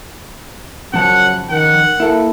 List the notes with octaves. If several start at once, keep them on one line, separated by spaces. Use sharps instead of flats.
F#2 C#3 F3 F#5 A5
D#3 F#5
A#3 E4 A4